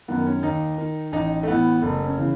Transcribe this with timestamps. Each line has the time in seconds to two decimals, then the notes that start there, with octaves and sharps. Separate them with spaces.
0.08 F#2 D#3 B3
0.26 C#4
0.43 D#2 D#4
0.78 D#3
1.12 A1 D#4
1.43 A3
1.48 A2 E3 B3
1.82 F#1 A3
2.05 C#4
2.18 C#3 E3